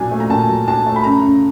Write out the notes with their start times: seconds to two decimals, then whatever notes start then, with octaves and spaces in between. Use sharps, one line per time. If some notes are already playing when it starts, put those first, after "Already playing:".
Already playing: A#2 F#3 D4 G#5
0.11 A3
0.20 A#5
0.30 A#2 A5
0.49 F#3
0.67 D4 A5
0.86 A3
0.96 B5
1.04 F#2 A#5
1.23 C#3